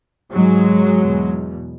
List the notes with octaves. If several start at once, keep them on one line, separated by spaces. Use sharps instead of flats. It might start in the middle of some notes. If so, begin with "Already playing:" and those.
G#2 F#3 G#3
E2 B2